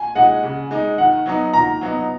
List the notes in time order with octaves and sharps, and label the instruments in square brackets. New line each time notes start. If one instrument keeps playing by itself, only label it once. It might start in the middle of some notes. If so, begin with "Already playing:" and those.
Already playing: [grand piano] G#5
[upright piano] G#3 D#4 [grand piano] F#5
[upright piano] C#3
G#3 D#4
[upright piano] D#3 [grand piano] F#5
[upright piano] F#3 B3 D#4
[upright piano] D#3 [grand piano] A#5
[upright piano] F#3 B3 D#4